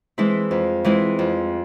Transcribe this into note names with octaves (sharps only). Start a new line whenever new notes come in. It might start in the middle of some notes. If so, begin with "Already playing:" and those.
E3 G#3 C4 E4
F2
E3 G#3 C4 E4
F2